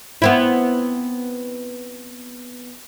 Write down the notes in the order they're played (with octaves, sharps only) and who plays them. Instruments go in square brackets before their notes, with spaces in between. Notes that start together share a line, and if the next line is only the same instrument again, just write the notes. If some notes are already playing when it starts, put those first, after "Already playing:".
[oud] B3 C4 E4